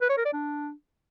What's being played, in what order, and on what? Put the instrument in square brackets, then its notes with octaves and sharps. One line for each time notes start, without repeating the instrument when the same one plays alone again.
[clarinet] B4
C#5
A#4
D5
D4